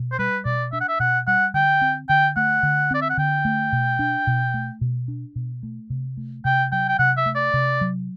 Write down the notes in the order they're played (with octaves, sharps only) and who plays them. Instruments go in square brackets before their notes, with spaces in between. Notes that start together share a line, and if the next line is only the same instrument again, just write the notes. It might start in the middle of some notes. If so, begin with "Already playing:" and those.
Already playing: [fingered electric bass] B2
[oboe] C5
[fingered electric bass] G3 [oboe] B4
[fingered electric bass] B2 [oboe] D5
[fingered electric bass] D4 [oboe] E5
[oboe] F#5
E5
[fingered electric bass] B2 [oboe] F#5
[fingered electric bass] G3 [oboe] F#5
[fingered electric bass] D3 [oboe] G5
[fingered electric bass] C4
[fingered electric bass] D3 [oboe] G5
[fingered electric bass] A3 [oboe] F#5
[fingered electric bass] D3
[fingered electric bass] C4 [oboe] D5
[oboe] E5
F#5
[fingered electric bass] D3 [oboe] G5
[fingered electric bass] A3
B2
D4
B2
A3
B2
D4
B2
A3
C3
A3
[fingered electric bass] C3 [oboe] G5
[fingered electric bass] F#3 [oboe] G5
[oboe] G5
[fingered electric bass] C3 [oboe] F#5
[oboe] E5
[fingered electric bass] A3
[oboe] D5
[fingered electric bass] C3
F#3